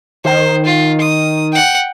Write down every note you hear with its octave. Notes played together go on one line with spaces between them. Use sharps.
D#3 C5
F4
D#6
F#5 G5